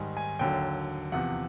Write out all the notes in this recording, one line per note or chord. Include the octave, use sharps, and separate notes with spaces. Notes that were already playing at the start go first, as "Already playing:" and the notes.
Already playing: G#2 D#3 G3 G#5
G#5
D#2 D3 F#3 G5
E2 C3 F3 F#5